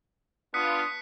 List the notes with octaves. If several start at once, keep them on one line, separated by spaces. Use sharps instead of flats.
B3 D4 F4 D#6 F#6 B6 C#7